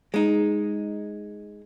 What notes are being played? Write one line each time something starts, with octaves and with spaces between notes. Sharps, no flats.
G#3 D#4